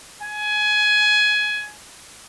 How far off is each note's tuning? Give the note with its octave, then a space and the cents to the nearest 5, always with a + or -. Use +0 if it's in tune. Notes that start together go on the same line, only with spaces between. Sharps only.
G#5 +20